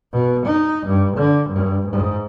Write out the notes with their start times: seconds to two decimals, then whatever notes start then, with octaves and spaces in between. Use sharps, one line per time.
0.13 B2
0.46 D#4
0.86 G2
1.16 D3
1.49 G2
1.87 G#2